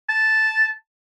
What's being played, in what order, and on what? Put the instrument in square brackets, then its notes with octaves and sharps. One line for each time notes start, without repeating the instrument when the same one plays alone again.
[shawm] A5